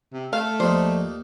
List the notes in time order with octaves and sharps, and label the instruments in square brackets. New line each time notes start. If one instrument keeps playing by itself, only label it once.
[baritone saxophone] C3
[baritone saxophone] A3 [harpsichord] A4 [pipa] F5
[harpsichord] D#2 A#3 D#4 [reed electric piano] F3 D5 [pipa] C5